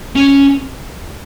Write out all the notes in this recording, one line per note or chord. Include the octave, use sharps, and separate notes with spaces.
C#4